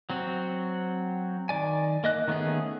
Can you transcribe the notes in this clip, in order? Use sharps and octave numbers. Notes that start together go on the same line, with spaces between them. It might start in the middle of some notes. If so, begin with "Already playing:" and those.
F#3 C4 F#4
D#3 D5 G#5
A#3 D#5 F#6
D#3 A3 B3 C#4 G#4